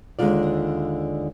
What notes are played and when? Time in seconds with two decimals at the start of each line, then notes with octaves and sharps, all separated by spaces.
0.19 D#2 D3 G#3 C4 F4 D5